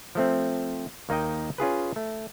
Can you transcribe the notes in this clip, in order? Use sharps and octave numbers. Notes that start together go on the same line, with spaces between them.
F3 A3 C4
D#2 A#3 D#4 D#5 G5
C#4 F4 G#4 B4
A3